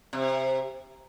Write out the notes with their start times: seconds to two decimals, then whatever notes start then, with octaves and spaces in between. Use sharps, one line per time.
0.13 C3